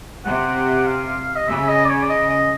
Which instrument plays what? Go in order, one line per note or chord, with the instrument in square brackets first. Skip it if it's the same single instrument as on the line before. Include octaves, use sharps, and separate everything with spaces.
[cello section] C3 [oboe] F#5
[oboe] F5
D#5
[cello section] C#3 [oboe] E5
[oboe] D#5
D5
C#5
D5
D#5
D#5